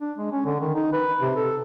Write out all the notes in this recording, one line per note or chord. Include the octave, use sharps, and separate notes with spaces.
D4
G#3
C#4
D3
D#3
D#4
B4
C3
A4